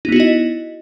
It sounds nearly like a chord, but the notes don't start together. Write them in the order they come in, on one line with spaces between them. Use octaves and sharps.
D#4 B3 F#4 E4 D#5